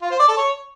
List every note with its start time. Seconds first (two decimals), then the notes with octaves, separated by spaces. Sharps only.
0.02 F4
0.11 C5
0.20 D5
0.28 A4
0.37 C#5